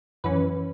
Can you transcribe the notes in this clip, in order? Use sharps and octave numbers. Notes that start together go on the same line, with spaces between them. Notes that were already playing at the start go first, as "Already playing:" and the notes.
F#2 E3 C#4 B4